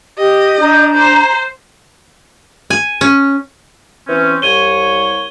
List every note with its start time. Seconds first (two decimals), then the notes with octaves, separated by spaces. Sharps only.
0.18 G4 D#5
0.60 D4 A#5 G6
0.95 C5
2.70 G#5
3.01 C#4
4.08 E3 C4 C#4
4.42 C2 C#5 G#6 D#7 G7